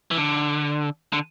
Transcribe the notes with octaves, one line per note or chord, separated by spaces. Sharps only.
E3
D3
D3